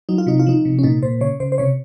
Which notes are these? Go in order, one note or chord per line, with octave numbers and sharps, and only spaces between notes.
F#3 D#4
F4
C3 D#4
F4
F3 D#4
C3
C#4
A#2 D#4
A#2 C5
C#3 C#5
C#3 C5
C5
C3 C#5